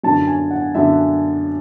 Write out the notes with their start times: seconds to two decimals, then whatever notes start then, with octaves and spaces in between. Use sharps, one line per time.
0.03 F#2 D3 A5
0.27 G#5
0.51 F#5
0.75 F#2 D3 E5